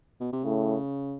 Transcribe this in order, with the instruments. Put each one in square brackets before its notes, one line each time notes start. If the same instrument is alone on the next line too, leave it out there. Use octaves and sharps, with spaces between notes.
[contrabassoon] B2
C3
[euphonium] A2 [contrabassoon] C#3